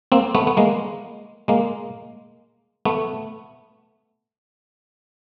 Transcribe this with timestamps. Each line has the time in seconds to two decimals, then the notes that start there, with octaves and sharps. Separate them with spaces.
0.12 A#3 C4
0.35 A3 B3
0.47 B3
0.57 G#3 A#3
1.48 G#3 A#3
2.85 A3 B3